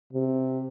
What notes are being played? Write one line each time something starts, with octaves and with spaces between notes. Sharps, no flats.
C3